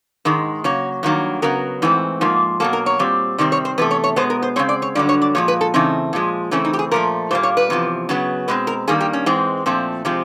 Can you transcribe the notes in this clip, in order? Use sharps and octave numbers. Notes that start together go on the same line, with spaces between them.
G#2 D#3 G#3
C#3 F#3 A#3 C#5
G2 D#3 F#3 A#3
C#3 F#3 B3 A#4
G#2 E3 A3 C4
G#2 F3 A#3
B2 F#3 A#3 A4
A#4
C#5
A#2 G3 C4
C3 D#3 G3 C4 D5
C#5
C5
E2 C3 A3 B4
C#5
C#5
B2 G#3 B3 C5
A#4
C5
C#3 F3 G#3 C4 C#5
D5
C#5
G2 D3 F#3 D5
C#5
D5
A#2 F3 G#3 C#5
B4
A4
C#3 E3 A3 C4 D#4
A#2 F3 G#3
C#3 E3 A3 C4 C#4
D#4
G4
G#4
A#2 F3 A3 A#4
A#2 G3 A#3 C5
C#5
B4
E2 C3 F3
C#3 F#3 B3
B2 G#3 C4 B4
A#4
G2 D#3 G3 A#3 G#4
G4
C#4
G#2 E3 G#3 C4
A#2 F3 A3 C4
C3 F3 G#3 C4